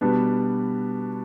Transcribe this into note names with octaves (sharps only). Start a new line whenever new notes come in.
B2 G3 B3 D4